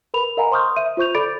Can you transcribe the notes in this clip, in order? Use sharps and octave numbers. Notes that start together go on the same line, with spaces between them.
A#4 B4 B5 F7
A#4 D#5 F5 F#5 G#5 A#5
C5 C6 C#6 D#6 F6 G6
E5 D#7
F4 C5 C#6 G6 F7
A4 D5 B5 D6 A6 D7